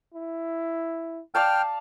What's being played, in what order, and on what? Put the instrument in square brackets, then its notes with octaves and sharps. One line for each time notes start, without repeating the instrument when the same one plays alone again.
[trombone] E4
[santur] D5 F5 A5 [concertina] G5 F6